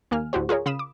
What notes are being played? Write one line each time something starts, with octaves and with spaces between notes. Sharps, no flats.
D#2 A#3 G#5 F6
D2 A2 F#4 G4 C5
F4 G#4 A#4 C#5
C#3 F5 B5 D#6 E7
D6